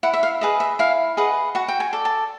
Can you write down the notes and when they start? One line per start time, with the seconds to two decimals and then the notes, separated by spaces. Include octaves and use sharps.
0.03 E4 F#5
0.14 E5
0.23 F5
0.41 G#4 B4 D#5 E5
0.60 E5
0.79 E4 F5
1.17 G#4 B4 D#5 F#5
1.55 F#4 F#5
1.68 G5
1.80 G#5
1.93 A4 D5
2.05 A5